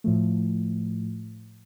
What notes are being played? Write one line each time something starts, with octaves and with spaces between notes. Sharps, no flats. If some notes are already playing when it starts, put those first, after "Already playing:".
A2 F3 A3